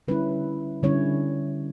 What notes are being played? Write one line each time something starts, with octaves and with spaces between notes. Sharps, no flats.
D3 G3 C#4 E4 B4
D3 G3 C#4 E4 C#5